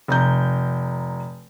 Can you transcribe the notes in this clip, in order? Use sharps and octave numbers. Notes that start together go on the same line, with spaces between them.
F1 A#5 G6